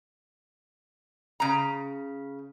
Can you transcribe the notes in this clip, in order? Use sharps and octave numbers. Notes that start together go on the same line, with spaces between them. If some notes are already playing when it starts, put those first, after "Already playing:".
C#3 A#5